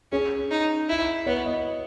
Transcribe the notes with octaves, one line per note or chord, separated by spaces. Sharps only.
C#4 G#4
D#4
E4
B3 C#5
D#5